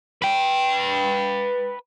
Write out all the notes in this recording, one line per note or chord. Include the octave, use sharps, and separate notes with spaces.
B4 G5